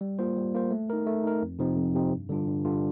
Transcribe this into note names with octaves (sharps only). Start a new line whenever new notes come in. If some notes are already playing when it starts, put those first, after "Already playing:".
G3
A#3 F4 C5
G3
A#3 F4 C5
A3
D#4 A#4
A3
D#4 A#4
F2
C3 F3 C4 D#4
F2
C3 F3 C4 D#4
G2
D3 G3 D4 F4
G2
D3 G3 D4 F4